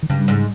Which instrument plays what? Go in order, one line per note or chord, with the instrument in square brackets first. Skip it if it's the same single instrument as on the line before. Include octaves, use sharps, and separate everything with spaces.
[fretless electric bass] D#3
[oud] G2 [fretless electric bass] C#3
[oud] G#2